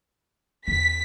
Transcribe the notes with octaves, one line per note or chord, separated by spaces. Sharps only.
E2 D4 B6